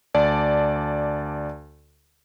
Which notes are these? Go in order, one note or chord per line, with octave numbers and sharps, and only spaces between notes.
D2 D5 A5